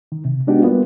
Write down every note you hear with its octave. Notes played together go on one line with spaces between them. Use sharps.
D#3
C3
G#3 B3 D4 D#4 F#4 G4
G3 A#3 B3 F4